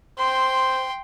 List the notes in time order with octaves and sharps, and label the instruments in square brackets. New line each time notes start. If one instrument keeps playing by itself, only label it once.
[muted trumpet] C5 [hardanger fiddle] G5 C6